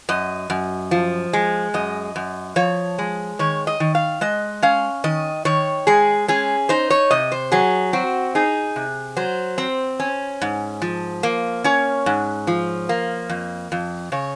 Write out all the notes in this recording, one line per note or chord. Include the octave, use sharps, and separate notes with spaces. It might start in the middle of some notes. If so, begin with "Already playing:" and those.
F#2 D#5
F#2
F3
G#3
F#2 D#5
F#2
F3 C#5
G#3
D#3 C#5
D#5
D#3
F5
G#3 D#5
C#4 F5
D#3 D#5
D#3 C#5
G#3 G#4
C#4 G#4
D#4 C5
C#5
C3 D#5
C5
F#3 G#4
C4 F#4
D#4 G#4
C3
F#3 C5
C4
C#4
G#2
F3
A#3
C#4 C#5
G#2
F3
A#3
F2
F2
C#3 C#5